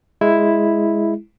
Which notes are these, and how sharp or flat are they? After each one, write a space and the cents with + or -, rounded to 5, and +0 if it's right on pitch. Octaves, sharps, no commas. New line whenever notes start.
G#3 +0 E4 +0